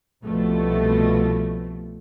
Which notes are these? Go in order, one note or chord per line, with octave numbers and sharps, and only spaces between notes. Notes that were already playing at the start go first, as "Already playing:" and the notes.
C2 B2 F3 A3